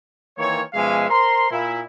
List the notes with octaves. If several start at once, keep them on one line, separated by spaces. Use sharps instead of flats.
D#3 E3 A#3 C4 C#5
B2 F3 G#3 C#4 E5 F5
A#4 C5 A#5 C6
A#2 E4